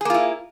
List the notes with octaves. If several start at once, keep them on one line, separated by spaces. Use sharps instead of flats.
A#3 E4 F4 G#4